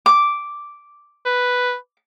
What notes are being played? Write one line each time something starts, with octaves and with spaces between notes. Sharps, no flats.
D6
B4